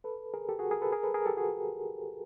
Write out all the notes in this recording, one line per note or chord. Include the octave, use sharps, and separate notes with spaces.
A4 B4
G#4 A#4
G4 A4
F#4 G#4
G#4 A#4
A4 B4
G#4 A#4
A4 B4
G#4 A#4
G4 A4
F#4 G#4